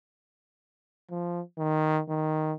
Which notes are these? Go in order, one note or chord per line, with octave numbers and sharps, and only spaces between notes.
F3
D#3
D#3